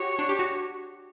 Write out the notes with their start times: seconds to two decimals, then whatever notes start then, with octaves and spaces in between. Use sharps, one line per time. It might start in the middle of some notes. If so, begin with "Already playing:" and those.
Already playing: F#4 G4 C#5
0.19 D4
0.29 G4
0.39 F#4